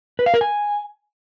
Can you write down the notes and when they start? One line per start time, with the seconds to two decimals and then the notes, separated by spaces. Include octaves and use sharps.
0.19 B4
0.26 F5
0.34 A#4
0.41 G#5